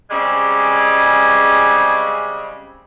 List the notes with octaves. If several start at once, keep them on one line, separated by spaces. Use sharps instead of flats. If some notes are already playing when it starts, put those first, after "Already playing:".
C#3 G3 G#3 C4